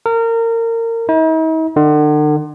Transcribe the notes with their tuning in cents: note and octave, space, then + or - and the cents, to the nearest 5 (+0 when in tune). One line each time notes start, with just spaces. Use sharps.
A#4 -25
D#4 +45
D3 +40